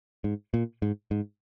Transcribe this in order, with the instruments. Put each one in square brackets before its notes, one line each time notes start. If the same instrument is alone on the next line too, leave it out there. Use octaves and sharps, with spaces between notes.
[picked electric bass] G#2
A#2
G#2
G#2